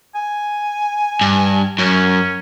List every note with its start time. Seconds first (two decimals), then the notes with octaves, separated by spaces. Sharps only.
0.15 G#5
1.21 G2
1.79 F#2 C#4